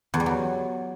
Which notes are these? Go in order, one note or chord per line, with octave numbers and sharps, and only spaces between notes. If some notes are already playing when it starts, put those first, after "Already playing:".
E2
G3
F#3